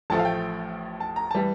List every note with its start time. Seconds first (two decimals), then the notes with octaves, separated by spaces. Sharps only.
0.10 A1 A2 F3 A3 A5
0.19 F5
0.25 G5
1.00 A5
1.16 A#5
1.31 E3 G3 A5